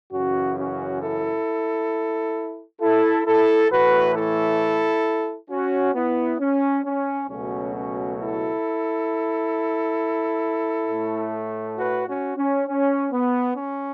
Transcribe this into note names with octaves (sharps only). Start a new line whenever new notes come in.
F#2 C#3 E3 C#4 F#4
C#4 F#4
E4 A4
E4 A4
E4 A4
A2 E3 A3 F#4 B4
E4 A4
C#4 F#4
B3 E4
C#4
C#4
C#2 B2 F#3 A3 C#4
C#4
E4 A4
A2 A3
F#4 B4
C#4 F#4
C#4
C#4
B3
C#4